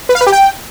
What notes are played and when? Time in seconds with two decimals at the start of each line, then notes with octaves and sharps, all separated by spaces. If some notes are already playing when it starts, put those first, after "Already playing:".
0.09 B4
0.15 F5
0.21 B4
0.27 G4
0.32 G5